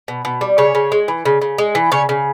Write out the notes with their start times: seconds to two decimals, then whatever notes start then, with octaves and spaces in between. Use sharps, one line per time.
0.08 B2
0.25 B2
0.41 G3
0.58 C#3 C#5
0.75 C#3
0.92 G#3
1.08 E3
1.25 C#3
1.41 C#3
1.58 G#3
1.75 E3
1.92 C#3 C#5
2.09 C#3